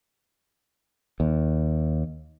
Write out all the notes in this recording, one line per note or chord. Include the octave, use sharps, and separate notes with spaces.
D#2